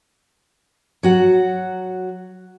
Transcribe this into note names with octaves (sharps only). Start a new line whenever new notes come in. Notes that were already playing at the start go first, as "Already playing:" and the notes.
F#3 F#4 F#5